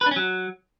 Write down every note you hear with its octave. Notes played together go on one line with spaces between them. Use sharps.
B4
D4
C#4
F#3